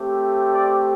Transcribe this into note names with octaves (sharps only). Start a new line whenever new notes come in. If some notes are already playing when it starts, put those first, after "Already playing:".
Already playing: A3 C4 G4
D5